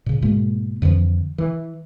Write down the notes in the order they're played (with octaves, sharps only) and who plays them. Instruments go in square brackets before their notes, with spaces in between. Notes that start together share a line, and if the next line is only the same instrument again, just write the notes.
[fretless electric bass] A#2 C#3
G#2 B2 G#3 A#3
F2 D3 E3 F3
E3